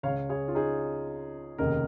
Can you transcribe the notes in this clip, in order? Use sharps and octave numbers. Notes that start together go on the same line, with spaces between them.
C#2 C#3 C#5 F5
G#4 C#5
F4
D#4 G#4
F1 D#2 C#3 A#4 D#5